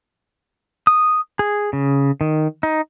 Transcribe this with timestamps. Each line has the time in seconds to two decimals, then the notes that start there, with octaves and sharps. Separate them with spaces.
0.87 D#6
1.39 G#4
1.73 C#3
2.21 D#3
2.63 D#4